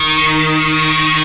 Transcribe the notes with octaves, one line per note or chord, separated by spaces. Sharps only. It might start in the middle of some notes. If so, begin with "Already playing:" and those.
Already playing: D#3